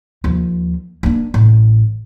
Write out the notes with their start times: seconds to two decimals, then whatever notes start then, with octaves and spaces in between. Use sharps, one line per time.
0.24 D#2 F3
1.03 A#3 D4
1.34 A1